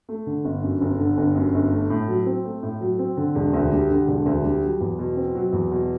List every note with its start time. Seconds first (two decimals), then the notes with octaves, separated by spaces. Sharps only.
0.09 A3
0.26 D3
0.45 G1
0.63 F#2
0.81 G1
1.00 D3
1.17 G1
1.35 F#2
1.54 G1
1.72 A3
1.90 A2
2.08 F#3
2.26 C4
2.45 A3
2.63 A2
2.81 F#3
2.99 C4
3.17 D3
3.35 E1
3.53 D2
3.72 G3
3.90 D3
4.08 E1
4.26 D2
4.44 G3
4.62 F#3
4.81 E2
4.99 B2
5.17 C4
5.35 F#3
5.53 E2
5.72 B2